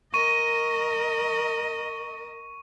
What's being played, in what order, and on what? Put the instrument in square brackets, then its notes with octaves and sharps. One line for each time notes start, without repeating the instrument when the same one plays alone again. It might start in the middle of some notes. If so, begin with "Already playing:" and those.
[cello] A#4 D#5 [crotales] C#6 D#7